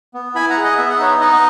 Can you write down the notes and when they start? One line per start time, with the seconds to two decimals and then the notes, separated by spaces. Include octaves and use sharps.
0.14 B3
0.35 E4 G#5 B5
0.50 F#5 A#5
0.57 G#4
0.64 D#5 F#5
0.77 B3 E5
0.90 F#5
0.99 D#4 C#5 E5
1.21 D#4 D#5 F#5